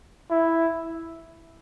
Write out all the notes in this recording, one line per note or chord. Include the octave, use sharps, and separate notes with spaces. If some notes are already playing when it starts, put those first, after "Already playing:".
E4